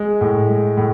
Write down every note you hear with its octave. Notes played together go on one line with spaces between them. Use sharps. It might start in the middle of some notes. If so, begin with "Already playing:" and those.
Already playing: G#3
A2
G#3
A2